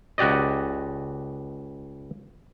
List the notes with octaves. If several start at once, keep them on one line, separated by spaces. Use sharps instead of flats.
C#2 F#4 G4 D5 D#5